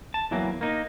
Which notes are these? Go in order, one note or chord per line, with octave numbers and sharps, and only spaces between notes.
A5
E2 E3 F#3 A#3
A#3 D#4